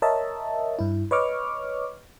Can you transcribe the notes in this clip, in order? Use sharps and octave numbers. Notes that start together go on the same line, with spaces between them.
A#4 C#5 D#5 E5 A5
G2 E4
B4 C#5 D#5 C#6 D6 F6